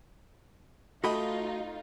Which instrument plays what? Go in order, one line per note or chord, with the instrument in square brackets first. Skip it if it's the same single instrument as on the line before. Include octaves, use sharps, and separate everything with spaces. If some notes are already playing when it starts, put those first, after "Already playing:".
[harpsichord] A3 D#5 G5 [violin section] D#4 F4 [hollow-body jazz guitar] F#4 B5